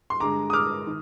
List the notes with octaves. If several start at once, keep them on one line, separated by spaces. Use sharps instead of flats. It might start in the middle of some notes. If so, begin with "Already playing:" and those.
C6
G2 D3 G#3 A#5 D6
D#6
D6 F6
D#3